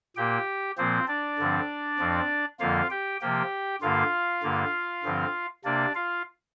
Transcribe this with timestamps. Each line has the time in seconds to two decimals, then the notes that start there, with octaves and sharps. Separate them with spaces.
0.16 A#2 A#3 G4 G5
0.77 A#2 F3 A#3 C4 C5
1.08 D4 D5
1.38 G2 D3 F3 C4
1.99 F2 F3 C4
2.60 F2 D3 F3 A#3 F4 F5
2.90 G4 G5
3.21 C3 F3 A#3 G4 G5
3.81 G2 D3 A#3 F4 F5
4.43 G2 D3 A#3
5.04 G2 D3 F3 C4
5.65 C3 A#3 D4 D5
5.95 F4 F5